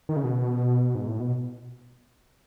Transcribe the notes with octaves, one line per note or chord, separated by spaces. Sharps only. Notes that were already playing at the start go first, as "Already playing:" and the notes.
D#3
C#3
B2
G#2
A2
B2